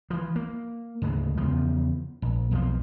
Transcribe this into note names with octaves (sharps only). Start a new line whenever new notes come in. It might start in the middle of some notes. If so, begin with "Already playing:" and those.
E3 F3
A#3
D2 G#2 C#3 G#3
E2 C#3 F3
A#1
B1 F2 D#3 F3